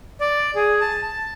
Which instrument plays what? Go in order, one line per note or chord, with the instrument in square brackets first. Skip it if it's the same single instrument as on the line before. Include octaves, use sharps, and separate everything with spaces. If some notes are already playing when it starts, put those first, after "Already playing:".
[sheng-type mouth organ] D5
G#4
A5
A5